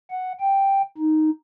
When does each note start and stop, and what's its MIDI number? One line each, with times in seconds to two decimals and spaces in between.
0.11 0.33 78
0.40 0.82 79
0.97 1.30 63